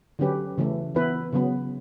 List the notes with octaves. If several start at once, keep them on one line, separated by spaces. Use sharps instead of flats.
D3 F#3 C#4 G4 B4
C#3 E3 A3
E3 B3 E4 B4
C#3 F#3 B3